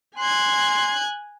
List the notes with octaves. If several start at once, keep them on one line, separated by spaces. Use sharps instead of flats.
G#5 C6 F#6 G#6